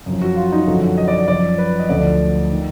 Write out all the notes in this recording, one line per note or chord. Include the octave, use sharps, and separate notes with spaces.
F#2 F3
F#4
F4
D#4
F#2 D3 F3 F#4
D#5
D5
D#5
F#2 F3 D5
B4
D#5
D2 D3 F3 D5
D#3